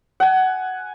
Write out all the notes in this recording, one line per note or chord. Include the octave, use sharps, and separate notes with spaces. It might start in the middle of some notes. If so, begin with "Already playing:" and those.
F#5 G#5